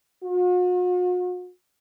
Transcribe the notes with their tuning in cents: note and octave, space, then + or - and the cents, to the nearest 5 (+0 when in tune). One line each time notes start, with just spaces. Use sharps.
F#4 -45